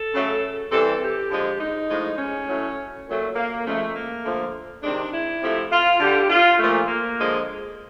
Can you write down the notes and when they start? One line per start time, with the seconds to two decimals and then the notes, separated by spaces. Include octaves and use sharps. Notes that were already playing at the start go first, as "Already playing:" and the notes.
Already playing: A4
0.14 C#3 F#3 A3
0.71 C3 E3 G3 A4
1.02 G4
1.31 D3 F3 G#3
1.60 D#4
1.90 A2 F3 G#3
2.18 C#4
2.48 A2 F#3 A3
3.07 A#2 F#3 A3
3.36 A#3
3.65 C#3 F3 G#3 A3
3.96 A#3
4.24 D3 F3 A3
4.83 C3 D#3 G#3 D4
5.13 E4
5.42 C3 F3 A3
5.72 F4
6.00 D3 G3 G4
6.30 F4
6.59 A#2 F3 A3
6.88 A#3
7.19 D3 F3 G#3